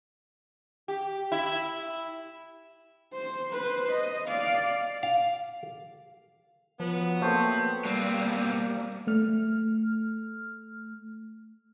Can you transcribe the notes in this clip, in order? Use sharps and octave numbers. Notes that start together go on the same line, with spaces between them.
G4
E4
C5
B4 C5
D#5
D5 F5
F5
F3 F#3 B3
A3 A#3 C4 C5
B2 G3 A#3 C4
A3 F6